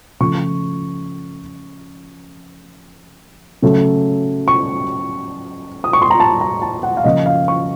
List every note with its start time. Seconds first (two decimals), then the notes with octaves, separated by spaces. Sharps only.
0.20 C#3 F3 A3 C#6
3.62 C#3 F#3 A3
4.48 C#6
5.84 D#6
5.93 C#6
6.02 C6
6.11 A#5
6.20 A5
6.41 A#5
6.62 A5
6.83 F#5
6.97 F5
7.04 C#3 F3 A#3 F4 D#5
7.26 F5
7.48 C#6